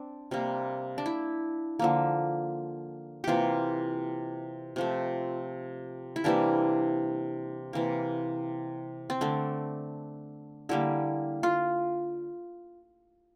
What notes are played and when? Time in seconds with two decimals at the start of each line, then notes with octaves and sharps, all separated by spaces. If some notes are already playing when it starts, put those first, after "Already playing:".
Already playing: C4 D4
0.31 C3 G3 A#3
0.98 D4
1.06 E4
1.79 D3 F3 A#3
3.24 C3 E3 A#3 F4 G4
4.76 C3 F3 A3
6.16 E4
6.24 C3 E3 G3 A#3 D4
7.73 C3 E3 A#3
9.10 C4
9.21 D3 A3 D4
10.69 D3 G3 A#3 E4
11.43 F4